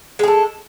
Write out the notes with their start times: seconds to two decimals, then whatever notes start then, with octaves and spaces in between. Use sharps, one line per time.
0.19 G#3
0.23 G#4
0.28 A4